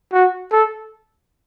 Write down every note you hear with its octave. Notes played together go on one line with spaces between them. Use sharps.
F#4
A4